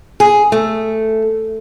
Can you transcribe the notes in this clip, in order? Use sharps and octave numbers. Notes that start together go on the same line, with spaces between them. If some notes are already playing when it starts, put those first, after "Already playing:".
G#4
A3